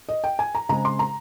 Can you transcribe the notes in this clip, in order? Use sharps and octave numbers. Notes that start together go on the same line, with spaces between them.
D#5
G5
G#5
A#5
C#3 G#3 C4 A#5
C6
A#5